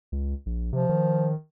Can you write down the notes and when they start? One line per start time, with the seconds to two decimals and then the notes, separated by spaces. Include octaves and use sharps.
0.12 C#2
0.46 A#1
0.73 C3 F3
0.89 D#3